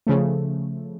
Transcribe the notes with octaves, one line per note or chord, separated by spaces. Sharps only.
C#3 F3 A3